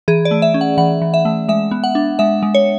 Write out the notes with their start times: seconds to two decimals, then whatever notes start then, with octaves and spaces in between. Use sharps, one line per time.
0.08 E3 G#4
0.25 D5
0.31 A3
0.42 E5
0.54 C#4
0.61 F#5
0.78 E3 F#5
1.02 E3
1.14 E5
1.25 A3
1.49 G#3 E5
1.71 B3
1.84 F#5
1.95 D4
2.19 G#3 E5
2.42 G#3
2.55 C#5